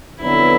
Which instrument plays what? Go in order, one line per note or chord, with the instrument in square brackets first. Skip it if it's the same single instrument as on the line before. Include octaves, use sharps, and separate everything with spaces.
[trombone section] F2 D3 F#3 B3 [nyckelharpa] E4